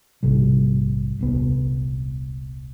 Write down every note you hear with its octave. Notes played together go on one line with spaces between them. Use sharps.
A#1 G#2 C3 G3
D#1 C2 B3